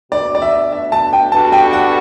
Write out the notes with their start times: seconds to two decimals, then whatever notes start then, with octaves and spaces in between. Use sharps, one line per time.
0.12 B2 A3 D4 F#4 B4 D5
0.35 D5
0.42 E5
0.72 E5
0.92 A5
1.13 G5
1.32 B2 G3 D4 F#4 A4 A5
1.52 G5
1.73 F#5